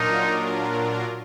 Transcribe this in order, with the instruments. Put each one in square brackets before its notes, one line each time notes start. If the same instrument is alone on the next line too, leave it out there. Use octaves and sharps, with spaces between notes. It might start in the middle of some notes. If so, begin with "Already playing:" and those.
Already playing: [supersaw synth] A#2 F#3 D4 F4 A#4 [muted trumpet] D#4